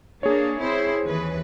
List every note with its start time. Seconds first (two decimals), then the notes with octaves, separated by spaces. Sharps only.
0.23 A#3 D4 G#4 C#5
0.61 C4 E4 C5
1.04 D#2 E3 B4